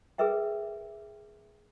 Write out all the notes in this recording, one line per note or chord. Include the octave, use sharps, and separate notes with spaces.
G#4 A#4 B4 E5 G5